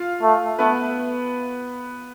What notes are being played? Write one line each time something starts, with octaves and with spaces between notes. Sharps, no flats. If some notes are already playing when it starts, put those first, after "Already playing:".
Already playing: F4 F5
A3
A3 B3 B4